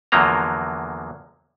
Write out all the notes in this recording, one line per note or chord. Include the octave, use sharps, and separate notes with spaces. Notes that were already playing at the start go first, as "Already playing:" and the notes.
E2 D3 F3 F#3 A#3 A#5